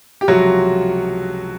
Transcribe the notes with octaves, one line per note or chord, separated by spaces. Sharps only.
G4
C#2 C3 F3 F#3 F#4